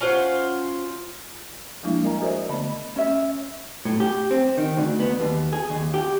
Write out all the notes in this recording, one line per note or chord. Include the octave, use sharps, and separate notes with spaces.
C#4 F4 C5 F#5
F3 G3 G#3 A#3 D4 E4
A#4 D#5 G#5 A#5
F#4 G#4 A#4 C5 D5 E5
D3 A3 B3 D#5 A5 B5
C#4 E5
A2
G4
C4
D#3
D2
B3
D#2
G#4
D#2
G4